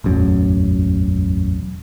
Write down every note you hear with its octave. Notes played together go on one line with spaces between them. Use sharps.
E1 A1 F#2